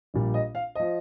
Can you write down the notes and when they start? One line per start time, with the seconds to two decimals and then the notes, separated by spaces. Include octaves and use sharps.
0.14 A#1 A#2 G3
0.34 D#5
0.55 F5
0.75 F3 D#5